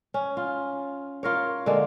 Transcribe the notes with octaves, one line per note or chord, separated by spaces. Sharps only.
C#4
F4
F4 A#4 C#5
D3 G#3 A#3